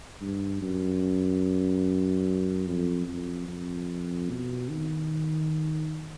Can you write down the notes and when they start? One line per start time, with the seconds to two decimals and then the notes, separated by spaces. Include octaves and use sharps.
0.21 G2
0.61 F#2
2.67 F2
3.07 F2
3.47 F2
4.30 B2
4.70 D#3